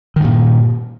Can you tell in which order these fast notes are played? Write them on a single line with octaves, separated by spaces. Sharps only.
D#3 G2 A#2